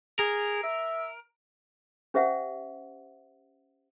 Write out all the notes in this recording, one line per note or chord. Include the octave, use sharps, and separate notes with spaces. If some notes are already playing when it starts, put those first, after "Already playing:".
G#4 A#4
E5
C#4 G4 C5 E5 F#5